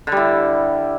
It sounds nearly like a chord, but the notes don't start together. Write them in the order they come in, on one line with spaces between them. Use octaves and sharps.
D3 G3 E4